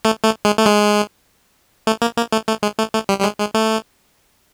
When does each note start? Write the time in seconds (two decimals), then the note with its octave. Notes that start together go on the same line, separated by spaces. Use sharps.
0.05 A3
0.24 A3
0.45 G#3
0.58 A3
0.65 G#3
1.87 A3
2.02 A#3
2.17 A#3
2.32 A3
2.48 A3
2.63 G#3
2.79 A3
2.94 A3
3.09 G3
3.20 G3
3.24 G#3
3.40 G#3
3.54 A3